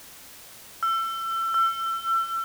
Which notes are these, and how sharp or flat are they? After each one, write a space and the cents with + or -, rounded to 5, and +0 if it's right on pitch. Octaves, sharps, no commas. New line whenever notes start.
E6 +30
E6 +35